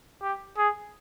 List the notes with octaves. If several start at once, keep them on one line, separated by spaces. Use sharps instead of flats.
G4
G#4